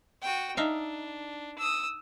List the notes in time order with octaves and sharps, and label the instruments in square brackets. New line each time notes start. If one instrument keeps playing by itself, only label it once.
[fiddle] F#4 G5
[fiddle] D4 [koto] D#4 E5 F5
[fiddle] D#6 E6